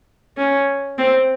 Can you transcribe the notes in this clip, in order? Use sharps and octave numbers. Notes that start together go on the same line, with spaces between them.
C#4
C4